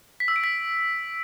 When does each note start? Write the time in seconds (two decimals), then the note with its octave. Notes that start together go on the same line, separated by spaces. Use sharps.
0.20 B6
0.28 E6
0.36 D7
0.44 B6